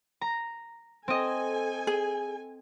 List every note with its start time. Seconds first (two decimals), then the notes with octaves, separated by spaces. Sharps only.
0.21 A#5
1.08 C4 A4 D#5 G#5
1.87 G#4